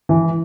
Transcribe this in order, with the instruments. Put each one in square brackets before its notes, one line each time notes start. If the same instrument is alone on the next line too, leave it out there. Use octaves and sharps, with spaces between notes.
[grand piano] E3